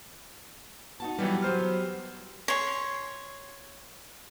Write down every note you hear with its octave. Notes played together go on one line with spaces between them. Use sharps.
D#4 F#4 A5
E3 F#3 G3 B3 G4
F#3 C5 F6
C#5 C6